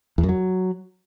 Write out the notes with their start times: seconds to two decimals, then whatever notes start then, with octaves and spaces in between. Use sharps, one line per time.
0.18 E2
0.23 F#2
0.29 F#3